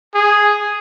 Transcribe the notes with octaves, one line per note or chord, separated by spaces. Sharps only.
G#4